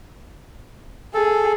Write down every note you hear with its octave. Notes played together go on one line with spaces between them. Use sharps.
G#4 A4